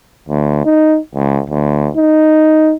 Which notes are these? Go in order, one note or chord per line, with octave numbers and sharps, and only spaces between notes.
D2
D#4
C#2
D2
D#4